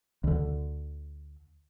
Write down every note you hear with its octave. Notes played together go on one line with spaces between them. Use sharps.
D2 D3